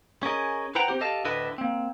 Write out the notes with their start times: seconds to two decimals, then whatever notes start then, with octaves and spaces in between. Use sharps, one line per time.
0.23 C#4 G#4 A#4 D#5
0.75 E4 B4 C5 F#5 G5 A#5
0.88 C4 G4 C5
1.00 G4 A4 D#5 F5 A5
1.24 D2 A2 D3 E4 B4 D#5
1.58 A#3 C4